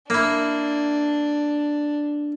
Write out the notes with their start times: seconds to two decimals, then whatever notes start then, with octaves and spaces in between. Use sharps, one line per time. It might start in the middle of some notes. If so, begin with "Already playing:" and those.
0.10 A#3 D4 E4